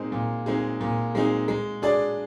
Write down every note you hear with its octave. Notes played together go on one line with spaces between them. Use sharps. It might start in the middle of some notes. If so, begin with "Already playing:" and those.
Already playing: A#2 G#3 C4 D#4 G#4
A#2
G#3 C4 D#4 G#4
A#2
G#3 C4 D#4 G#4
G#3
D4 G#4 D5